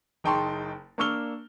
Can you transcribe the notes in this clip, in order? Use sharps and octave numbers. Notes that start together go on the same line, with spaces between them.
F#1 D#4 G5 A5 C6 C#6
A#3 D4 C#6 E6 F6 G7